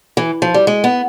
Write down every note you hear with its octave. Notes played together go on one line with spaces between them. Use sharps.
E3
F3
G3
G#3
B3